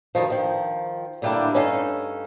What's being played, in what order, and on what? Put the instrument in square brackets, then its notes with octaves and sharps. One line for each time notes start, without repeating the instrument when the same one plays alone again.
[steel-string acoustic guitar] D2 G2 D#3 F3
D#3 F3
A2 D3 G3 A#3 D4 E4
G2 C#4 D#4 A4 F5